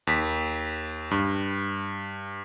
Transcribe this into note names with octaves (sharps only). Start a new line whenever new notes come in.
D#2 B6
G2